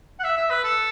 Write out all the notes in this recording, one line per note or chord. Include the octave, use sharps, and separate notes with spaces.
F#5
E5
E5
B4
A4